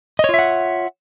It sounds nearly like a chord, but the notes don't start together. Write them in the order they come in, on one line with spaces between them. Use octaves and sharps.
D#5 C#5 F4 E5 F#5